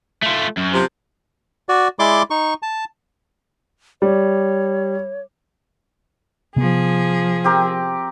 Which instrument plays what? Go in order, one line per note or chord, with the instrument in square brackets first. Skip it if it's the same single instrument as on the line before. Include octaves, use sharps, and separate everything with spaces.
[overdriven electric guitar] A3 F4
F#2
[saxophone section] C3 F3
[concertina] F#4 D5
G#3 E4 D5 C6 D6
D#4 C#6
A5
[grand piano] G3 [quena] C#5
[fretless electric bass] C3 B3 [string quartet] F3 G#4
[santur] C4 G4 A#4